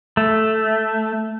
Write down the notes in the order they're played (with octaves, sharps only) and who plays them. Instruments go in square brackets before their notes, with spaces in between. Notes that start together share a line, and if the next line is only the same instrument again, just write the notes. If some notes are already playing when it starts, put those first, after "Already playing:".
[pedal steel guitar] A3